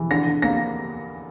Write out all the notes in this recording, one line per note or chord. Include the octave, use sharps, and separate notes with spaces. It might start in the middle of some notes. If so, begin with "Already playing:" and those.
Already playing: E3
D3 A#6
D3
A#3 A#6